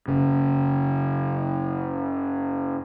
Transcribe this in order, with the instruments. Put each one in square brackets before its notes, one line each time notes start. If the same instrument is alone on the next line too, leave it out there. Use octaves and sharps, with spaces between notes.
[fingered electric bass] F#1 C#3